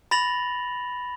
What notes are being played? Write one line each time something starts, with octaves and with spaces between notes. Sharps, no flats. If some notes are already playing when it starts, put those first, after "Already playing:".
B5 A6 A#6 F7 F#7